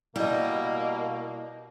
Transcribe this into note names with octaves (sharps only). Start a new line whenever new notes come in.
B2 G3 A#3 E4 D#5